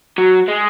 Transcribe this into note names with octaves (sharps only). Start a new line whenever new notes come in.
F#3
G#3